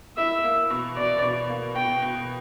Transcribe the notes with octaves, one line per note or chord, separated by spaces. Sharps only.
E4 E5
A#3
B2
B2 D5
B2
A#3
B2 G5
B2